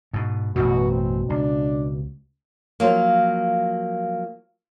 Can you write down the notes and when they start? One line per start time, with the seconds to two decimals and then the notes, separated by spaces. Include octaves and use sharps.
0.13 G#2 B2
0.56 A1 F#2 B2 F#4
0.92 C4
1.30 C#2 D4
2.80 F3 F#3 A#3